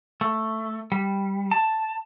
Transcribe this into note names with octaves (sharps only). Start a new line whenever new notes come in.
A3
G3
A5